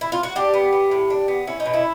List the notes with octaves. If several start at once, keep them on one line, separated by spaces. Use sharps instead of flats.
E4
F4
F#4
D4 G4
B3
B3
A2
D4
B3
C#4 E4
D#4
B2
E4